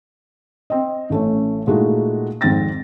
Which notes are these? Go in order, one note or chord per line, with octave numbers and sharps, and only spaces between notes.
C4 D#5
A1 A3 C#4
A#2 G#3 A3 D#4 E4 F#4
G#1 F2 G#2 C4 A6 A#6